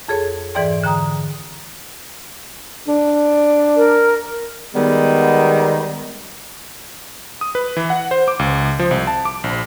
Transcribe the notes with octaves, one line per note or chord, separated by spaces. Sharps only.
F2 G#4 A4 C#5
G#2 E3 G#4 D5 G5 C6
D3 G5 A#5 D#6
D4
A#4
D#3 G3 G#3 B3
D#6
B4
E3
F#5
C5
D6
C#2
F3
C2
A5
D6
A#1